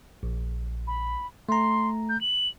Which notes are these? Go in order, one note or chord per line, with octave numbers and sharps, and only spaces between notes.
A#1
B5
A3 A#5 C6
G6
F#7